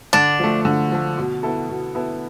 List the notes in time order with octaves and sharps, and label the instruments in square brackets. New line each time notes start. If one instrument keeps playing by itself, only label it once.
[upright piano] D3 [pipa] D4
[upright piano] F3 A3
D3
F3 A3
B2
B3 E4 A4
B2
B3 E4 A4